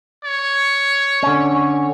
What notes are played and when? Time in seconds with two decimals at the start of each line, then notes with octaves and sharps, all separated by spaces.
0.24 C#5
1.23 D3 C#4